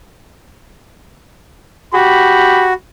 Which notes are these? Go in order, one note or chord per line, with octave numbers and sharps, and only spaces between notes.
F#4 G4 B5